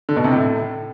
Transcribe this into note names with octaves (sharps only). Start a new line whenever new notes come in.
D3
B2
C3
A2